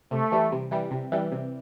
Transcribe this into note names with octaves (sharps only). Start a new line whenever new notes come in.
C3 A3
E3 G3
C3
E3 G3
C3
E3 G3
C3